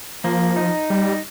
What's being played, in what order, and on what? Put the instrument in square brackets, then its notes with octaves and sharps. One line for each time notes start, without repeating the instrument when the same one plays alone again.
[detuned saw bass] F3 [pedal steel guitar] A#3
[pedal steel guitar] D#4
[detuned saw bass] G3